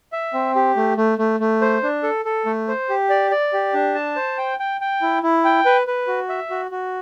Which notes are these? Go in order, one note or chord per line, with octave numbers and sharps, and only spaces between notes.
E5
C4
G4
A3
A3
A3
A3
C5
D4
A4
A4
A3
C5
G4
D5
D5
G4
D4
A5
C5
G5
G5
G5
E4
E4
G5
B4
B4
F#4
E5
F#4
F#4